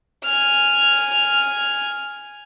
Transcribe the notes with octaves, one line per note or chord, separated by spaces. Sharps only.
G#5 F6